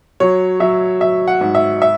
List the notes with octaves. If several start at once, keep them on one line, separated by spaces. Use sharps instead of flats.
F#3 C#5
F#3 E5
F#3 E5
F#5
G#2
E5
E5